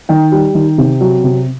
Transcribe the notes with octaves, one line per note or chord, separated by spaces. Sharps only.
D#3 G5
G3
D#3
C3
F#3
C3